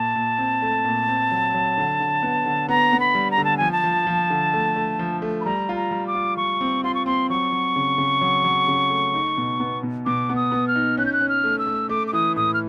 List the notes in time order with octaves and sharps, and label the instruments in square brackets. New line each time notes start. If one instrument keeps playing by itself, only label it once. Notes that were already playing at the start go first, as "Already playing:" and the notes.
Already playing: [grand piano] A#2 [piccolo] A5
[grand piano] A#2
C4
A3
A#2
C4
F#3
F#3
D3
D3
B3
D3
[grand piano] B3 [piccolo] A#5
[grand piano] B3
[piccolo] B5
[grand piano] G3
[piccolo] A#5
[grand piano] D3
[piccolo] A5
[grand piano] F3 [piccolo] G#5
[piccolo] A5
[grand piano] F3
F3
D3
A3
A3
F3
A3
[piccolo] B5
[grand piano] G3 [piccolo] A#5
[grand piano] F4
[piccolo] A#5
[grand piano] G3
[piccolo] D6
[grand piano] F4
[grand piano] G3 [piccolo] C#6
[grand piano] C4
[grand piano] F4 [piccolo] C6
[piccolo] C#6
[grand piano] C4 [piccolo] C6
[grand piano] F#3 [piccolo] C#6
[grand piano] F#3
C#3
C#3
F#3
F#3
C#3
A3
D#4
B2
B3
B2
[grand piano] B2 [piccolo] D6
[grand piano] B3
[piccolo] D#6
[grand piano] B3
[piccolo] F6
[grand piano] D#4
[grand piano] C#4 [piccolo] F#6
[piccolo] G6
F#6
[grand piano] C#4
[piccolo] F6
[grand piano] A3
[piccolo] E6
[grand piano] A3
[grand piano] A3 [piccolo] D6
[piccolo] D6
[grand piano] E3 [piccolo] D#6
[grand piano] A2 [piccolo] D#6
[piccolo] F6